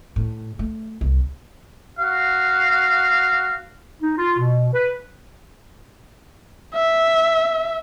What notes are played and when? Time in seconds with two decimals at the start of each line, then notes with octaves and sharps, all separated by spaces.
0.16 A2
0.59 A3
1.01 C2
1.99 F#4 F5
4.02 D#4
4.18 F4
4.39 B2
4.74 B4
6.74 E5